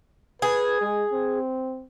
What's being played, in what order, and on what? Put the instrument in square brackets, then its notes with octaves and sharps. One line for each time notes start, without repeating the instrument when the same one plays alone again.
[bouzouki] G#4 [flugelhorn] B4
[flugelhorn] G#3
C4